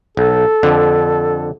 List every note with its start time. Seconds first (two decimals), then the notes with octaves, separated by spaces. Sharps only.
0.17 B1 A4
0.63 F2 D3